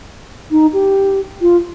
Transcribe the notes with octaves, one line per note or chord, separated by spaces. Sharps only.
D#4
G4
F4